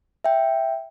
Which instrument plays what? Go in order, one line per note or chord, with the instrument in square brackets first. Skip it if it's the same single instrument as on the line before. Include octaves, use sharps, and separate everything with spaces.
[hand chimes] E5 G5